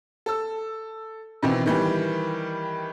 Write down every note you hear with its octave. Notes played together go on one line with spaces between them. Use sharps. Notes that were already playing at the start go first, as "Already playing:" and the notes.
A4 E6
B2 D#3 E3 C4
D#3 E3 G3